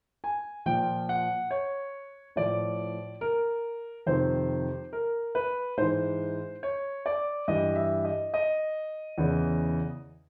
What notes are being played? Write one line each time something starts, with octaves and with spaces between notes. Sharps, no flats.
G#5
A#2 F3 G5
F#5
C#5
A2 F3 D5
A#4
F2 C3 D#3 C5
A#4
B4
G#2 E3 C5
C#5
D5
G2 E3 D#5
E5
D#5
D#5
E2 C#3 E3